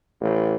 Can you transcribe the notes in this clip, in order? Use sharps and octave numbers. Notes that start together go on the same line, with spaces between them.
A1